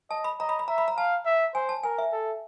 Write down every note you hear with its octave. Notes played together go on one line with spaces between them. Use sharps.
D#5 A5
B5
D#5 A#5
B5
B5
E5 A#5
B5
A#5
F5 A5
E5
C5 G#5
A5
A#4 G#5
E5
A4